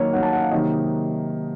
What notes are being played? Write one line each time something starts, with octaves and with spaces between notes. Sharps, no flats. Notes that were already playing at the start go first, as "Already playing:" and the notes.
Already playing: D#3 F#3 A#3 C#5
D#3 F#3 A#3 F#5
A5
F#5
F5
C3 D#3 F#3 A#3 D#4 D#5